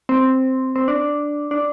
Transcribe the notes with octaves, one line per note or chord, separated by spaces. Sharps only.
C4
C4
D4
D4